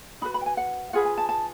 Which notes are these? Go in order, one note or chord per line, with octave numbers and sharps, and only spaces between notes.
D#4 F#4 B4 B5
B5
G5
G#5
F#5
F4 G#4 B4 F#5
G#5
A5
A5